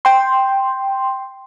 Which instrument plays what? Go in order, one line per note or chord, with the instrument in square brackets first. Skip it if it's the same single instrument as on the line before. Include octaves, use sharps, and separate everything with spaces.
[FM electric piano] G5 C6